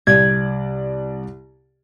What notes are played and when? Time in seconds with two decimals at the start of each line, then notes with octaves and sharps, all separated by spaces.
0.07 C2 D5 G#6